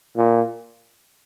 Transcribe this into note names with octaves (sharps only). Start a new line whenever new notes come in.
A#2